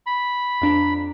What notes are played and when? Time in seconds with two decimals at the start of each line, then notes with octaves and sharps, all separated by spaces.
0.06 B5
0.61 F2 D4 A#5